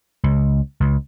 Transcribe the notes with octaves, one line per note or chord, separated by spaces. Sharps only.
C#2
C#2